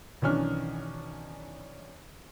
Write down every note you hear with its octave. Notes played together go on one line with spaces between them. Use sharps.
B1 D#3 E3 C#4 D4 F6